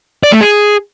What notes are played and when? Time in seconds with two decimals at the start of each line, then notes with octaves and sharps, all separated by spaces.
0.24 D5
0.32 A3
0.41 G#4